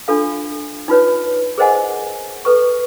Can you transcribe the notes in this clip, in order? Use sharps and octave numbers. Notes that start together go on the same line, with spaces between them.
D4 F4 A4 F5
D#4 F4 B4 C#5
G#4 A#4 C5 D#5 F#5 G#5
A4 B4 C#6